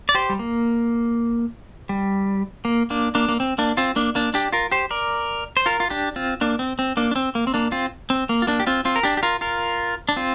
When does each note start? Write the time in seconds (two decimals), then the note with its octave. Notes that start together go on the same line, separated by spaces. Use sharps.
0.09 D5
0.15 G4 C5
0.29 G3
0.39 A#3
1.89 G3
2.65 A#3
2.90 A#3 D4
3.15 A#3 D4
3.29 A#3
3.40 C4
3.58 A#3 D4
3.77 C4 F4
3.96 A#3 D4
4.15 A#3 D4
4.34 D4 G4
4.53 F4 A#4
4.72 G4 C5
4.91 A#4 D5
5.57 C5
5.66 F4 A#4
5.80 F4
5.90 D4 G4
6.16 C4 F4
6.41 A#3 D4
6.59 C4
6.79 C4
6.97 A#3 D4
7.11 D4
7.16 C4
7.35 A#3
7.47 C4
7.54 A#3 D4
7.72 C4 F4
8.10 C4
8.29 A#3
8.42 F4
8.47 A#3 D4
8.60 G4
8.67 C4 F4
8.85 C4 F4
8.96 A#4
9.03 D4 G4
9.17 G4
9.23 F4 A#4
9.41 F4 A#4
10.09 D4
10.16 C4 F4